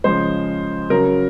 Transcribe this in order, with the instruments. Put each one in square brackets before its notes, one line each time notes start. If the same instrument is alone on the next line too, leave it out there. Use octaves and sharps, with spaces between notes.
[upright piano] C#3 F3 G#3 C5
C#3 F#3 A#4